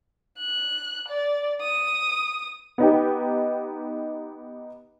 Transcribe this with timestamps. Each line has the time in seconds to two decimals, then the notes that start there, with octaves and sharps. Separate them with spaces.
0.39 F#6
1.08 D5
1.62 D#6
2.78 B3 D#4 G4